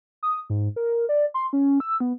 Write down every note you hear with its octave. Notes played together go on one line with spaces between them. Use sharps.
D#6
G#2
A#4
D5
C6
C#4
E6
B3